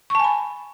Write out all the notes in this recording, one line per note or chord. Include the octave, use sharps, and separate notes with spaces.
G#5 A5 B5 C#6